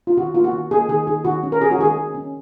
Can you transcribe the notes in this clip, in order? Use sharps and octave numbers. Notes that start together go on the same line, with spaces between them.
F4
D#3 F#4
A#3 F4
F#4
D#3
A#3 G#4
D#3 G#4
D#3 G#4
D#3 F#4
C#4
A#4
C#4 G#4
F#4
D#3 G#4
C#4
C#4